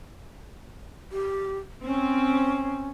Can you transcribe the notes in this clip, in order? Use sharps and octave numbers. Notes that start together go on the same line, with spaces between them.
G4
C4 C#4